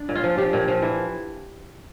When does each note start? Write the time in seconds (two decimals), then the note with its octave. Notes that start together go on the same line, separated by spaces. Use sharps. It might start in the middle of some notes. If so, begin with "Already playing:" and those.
Already playing: D4
0.09 A#2
0.15 F4
0.23 F3
0.38 F3 G4
0.53 A#2
0.68 F3
0.82 E3